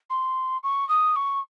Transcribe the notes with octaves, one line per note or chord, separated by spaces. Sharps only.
C6
C#6
D#6
C#6